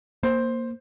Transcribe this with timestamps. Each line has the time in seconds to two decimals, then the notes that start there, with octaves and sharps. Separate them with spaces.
0.23 A#3 C5